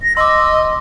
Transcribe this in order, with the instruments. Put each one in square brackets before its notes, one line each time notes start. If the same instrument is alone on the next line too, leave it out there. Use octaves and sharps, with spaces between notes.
[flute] A#6
[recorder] D#5 [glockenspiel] C6 D6 [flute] E6